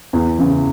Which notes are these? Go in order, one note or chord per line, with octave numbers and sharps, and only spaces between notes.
E2
C#3 E3